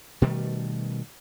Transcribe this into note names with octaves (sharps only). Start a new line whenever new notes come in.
B2 D#3 G3 A3